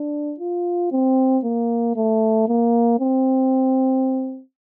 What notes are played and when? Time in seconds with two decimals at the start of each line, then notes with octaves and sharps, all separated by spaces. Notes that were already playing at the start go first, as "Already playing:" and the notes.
Already playing: D4
0.39 F4
0.91 C4
1.44 A#3
1.96 A3
2.48 A#3
3.00 C4